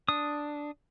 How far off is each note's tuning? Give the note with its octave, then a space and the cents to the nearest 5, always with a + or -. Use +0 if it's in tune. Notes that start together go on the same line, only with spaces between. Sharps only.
D4 +0 D#6 +0